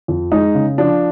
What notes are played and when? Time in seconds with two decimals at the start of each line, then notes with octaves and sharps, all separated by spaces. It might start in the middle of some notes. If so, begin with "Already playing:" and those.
0.08 F2
0.32 G#3 D#4
0.55 C#3
0.78 F3 D4